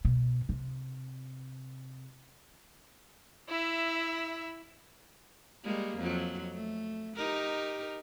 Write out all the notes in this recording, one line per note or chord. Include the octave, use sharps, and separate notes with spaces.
B2
C3
E4 E5
G3 G#3 A#3
F2 F#3
A3
D#4 G4 A#4